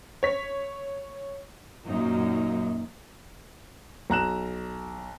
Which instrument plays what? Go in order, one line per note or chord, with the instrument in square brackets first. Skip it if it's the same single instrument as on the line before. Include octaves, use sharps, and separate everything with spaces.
[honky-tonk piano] C#5 B6
[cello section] F#2 A#2 F#3 A#3 D#4
[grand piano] B1 A#5 F#6 E7